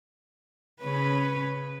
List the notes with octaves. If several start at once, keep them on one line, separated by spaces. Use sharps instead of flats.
C#3 C#4 B4